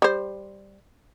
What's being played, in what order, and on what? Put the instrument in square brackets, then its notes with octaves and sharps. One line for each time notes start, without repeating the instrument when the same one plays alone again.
[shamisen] G3 C5